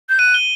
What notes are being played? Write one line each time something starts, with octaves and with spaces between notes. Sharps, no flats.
G6
F#6 D#7
G7